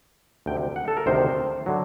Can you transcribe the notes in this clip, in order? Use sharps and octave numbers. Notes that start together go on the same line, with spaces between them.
D2 C3 D#3 G5
F#5
A4
A#4
D2 C3 D#3 C5
D3 F#3